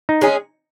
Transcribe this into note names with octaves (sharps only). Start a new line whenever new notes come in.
D#4
G#3 C#4 G#4